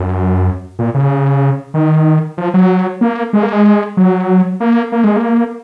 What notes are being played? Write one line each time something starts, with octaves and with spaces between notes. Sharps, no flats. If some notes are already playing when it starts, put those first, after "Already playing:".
Already playing: F#2
A#2
C#3
D#3
F3
F#3
A#3
G#3
A#3
G#3
F#3
A#3
A#3
G#3
A#3